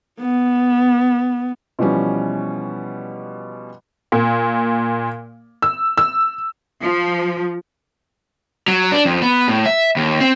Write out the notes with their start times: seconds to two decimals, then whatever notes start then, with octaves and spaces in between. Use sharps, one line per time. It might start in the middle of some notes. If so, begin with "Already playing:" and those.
0.21 B3
1.79 B2 E3 F3 G3 C#4
4.12 A#2
5.62 E6
5.97 E6
6.83 F3
8.68 F#3
8.92 D4
9.05 F2
9.22 B3
9.48 A2
9.66 E5
9.96 D#2
10.21 C4